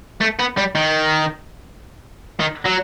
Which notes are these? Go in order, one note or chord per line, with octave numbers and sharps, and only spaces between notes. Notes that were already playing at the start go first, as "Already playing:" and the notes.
A3
B3
G3
D#3
D#3
F#3